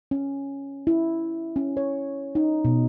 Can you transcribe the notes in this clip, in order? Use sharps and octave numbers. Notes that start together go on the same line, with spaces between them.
C#4
E4
C#4
C#5
D#4
B2